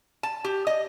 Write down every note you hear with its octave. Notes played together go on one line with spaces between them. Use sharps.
A5
G4
D#5